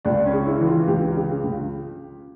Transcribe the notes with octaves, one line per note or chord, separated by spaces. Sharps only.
C#2 D4
C#4
C#3
E4
E3
F4
C#2 G4
C#3
C#2